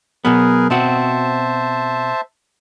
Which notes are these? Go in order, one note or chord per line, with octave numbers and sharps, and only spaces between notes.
B2 F#3 B3 G#4 A#4 B4
B2 C4 F#4 C5 E5 A5